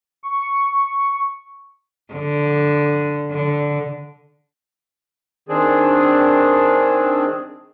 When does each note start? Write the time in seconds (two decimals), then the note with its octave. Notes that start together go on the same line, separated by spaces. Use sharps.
0.23 C#6
2.13 D3
3.31 D3
5.49 D#3 C4 D4 G#4